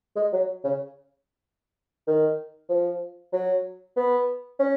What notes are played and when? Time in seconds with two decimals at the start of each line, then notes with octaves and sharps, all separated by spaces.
0.16 G#3
0.33 F#3
0.64 C#3
2.07 D#3
2.69 F3
3.33 F#3
3.97 B3
4.59 C#4